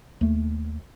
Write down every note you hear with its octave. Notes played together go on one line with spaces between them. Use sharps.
D#2 A3